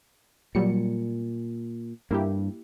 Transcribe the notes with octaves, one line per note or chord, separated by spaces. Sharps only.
A#2 F#3 G3 C#7
G2 A#3 E4 G4